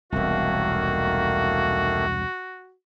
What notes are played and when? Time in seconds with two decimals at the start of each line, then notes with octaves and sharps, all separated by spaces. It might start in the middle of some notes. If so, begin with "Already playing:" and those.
0.12 E1 C2 D#3 A3 A#3 F#4